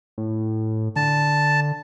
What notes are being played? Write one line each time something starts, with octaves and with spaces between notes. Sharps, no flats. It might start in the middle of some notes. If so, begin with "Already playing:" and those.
A2
D3 A5